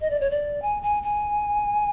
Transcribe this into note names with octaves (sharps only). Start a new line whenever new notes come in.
D#5
D5
C#5
D5
G#5
G#5
G#5